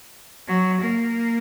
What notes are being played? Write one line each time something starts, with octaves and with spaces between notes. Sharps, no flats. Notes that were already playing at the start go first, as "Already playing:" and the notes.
F#3
A#3